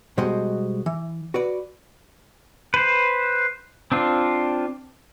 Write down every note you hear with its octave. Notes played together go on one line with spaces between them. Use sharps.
B2 G3 G#3 F#4 C5 D#5
E3
F#4 B4 D5
B4 C5
C4 D4 F4